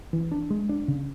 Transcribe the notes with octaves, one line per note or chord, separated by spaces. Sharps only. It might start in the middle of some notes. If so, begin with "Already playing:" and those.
E3
D4
G#3
D4
C#3